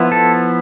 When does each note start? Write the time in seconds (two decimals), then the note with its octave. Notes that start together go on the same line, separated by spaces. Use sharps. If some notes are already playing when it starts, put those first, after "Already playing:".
Already playing: F3 B3 E4
0.12 A4